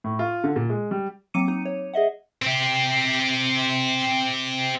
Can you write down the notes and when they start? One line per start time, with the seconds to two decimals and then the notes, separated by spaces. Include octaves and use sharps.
0.04 A2
0.19 F4
0.44 D3
0.56 A#2
0.70 G#3
0.91 G3
1.34 F#3 A#3 C4 D6 C#7 D#7
1.48 D#4
1.65 C#5
1.94 G#4 D#5 E5 F#5
2.42 C4 G4